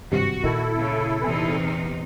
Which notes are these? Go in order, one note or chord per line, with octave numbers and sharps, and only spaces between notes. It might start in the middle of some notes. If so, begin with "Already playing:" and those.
G#1 G2 C3 F#4
A#2 D#3 E4 A4
C#3
E2 C3 D#4 B4 G#5